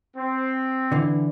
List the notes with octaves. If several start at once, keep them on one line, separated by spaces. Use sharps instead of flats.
C4
D3 E3